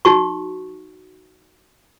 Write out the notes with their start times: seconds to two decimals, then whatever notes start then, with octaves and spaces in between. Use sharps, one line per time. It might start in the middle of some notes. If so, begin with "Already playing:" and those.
0.05 D#4 F#4 C#6